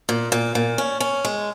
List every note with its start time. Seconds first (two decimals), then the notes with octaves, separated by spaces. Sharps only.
0.09 A#2
0.32 A#2
0.55 A#2
0.78 C#4
1.00 C#4
1.25 G#3